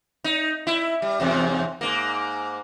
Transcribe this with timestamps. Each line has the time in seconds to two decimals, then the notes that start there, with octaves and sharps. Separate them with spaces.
0.24 D#4
0.67 E4
1.02 G3
1.20 E2 G#2 C3
1.81 G#2 A#3